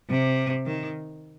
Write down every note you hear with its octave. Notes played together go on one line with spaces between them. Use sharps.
C3
D#3